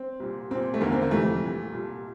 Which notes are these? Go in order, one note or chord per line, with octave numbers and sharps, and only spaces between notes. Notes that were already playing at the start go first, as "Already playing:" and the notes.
Already playing: C4
C2 A#2
C2 A#2 C4
A3
E2 D3 A#3
C4
A#3
F2 C3 E3 A3
C2 A#2
C2 A#2